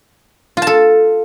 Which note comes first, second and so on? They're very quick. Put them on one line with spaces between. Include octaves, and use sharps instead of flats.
F4 A5 A4